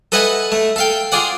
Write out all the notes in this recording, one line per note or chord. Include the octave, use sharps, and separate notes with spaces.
A4 B4 D#5 E5 F#5 G#5
A3
A4 F5 G5
F4 G#4 D5 F#5